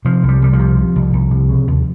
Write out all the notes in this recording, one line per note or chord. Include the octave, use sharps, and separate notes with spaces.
C3 F3
C2
G3
C2 G3
F3
C3
C3
C2
C2
C3
C#3
D#2